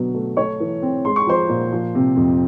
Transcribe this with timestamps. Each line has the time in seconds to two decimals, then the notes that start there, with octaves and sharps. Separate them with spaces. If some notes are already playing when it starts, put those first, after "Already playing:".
Already playing: B2 D3 F#3 B3
0.14 A3
0.37 A3 C#5 C#6
0.60 E3
0.82 C4
1.05 G#3 C6
1.16 C#6
1.27 F3 C5 C6
1.49 A#2
1.72 F3
1.95 C3
2.16 F2